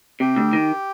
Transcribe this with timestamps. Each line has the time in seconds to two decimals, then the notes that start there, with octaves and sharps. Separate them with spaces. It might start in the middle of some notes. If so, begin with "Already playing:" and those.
0.20 C3 G4
0.36 D2
0.53 D#3